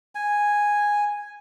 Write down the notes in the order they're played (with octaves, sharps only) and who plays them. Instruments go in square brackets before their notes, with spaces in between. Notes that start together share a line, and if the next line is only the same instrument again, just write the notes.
[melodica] G#5